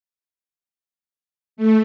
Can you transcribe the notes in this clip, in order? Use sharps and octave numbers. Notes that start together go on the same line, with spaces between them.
A3